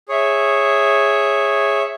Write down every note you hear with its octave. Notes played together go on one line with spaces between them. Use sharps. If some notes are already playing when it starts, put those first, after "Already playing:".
G#4 C#5 E5